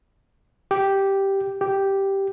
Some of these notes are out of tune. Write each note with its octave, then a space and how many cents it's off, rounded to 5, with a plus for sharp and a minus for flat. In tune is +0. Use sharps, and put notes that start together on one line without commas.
G4 -5
G4 -5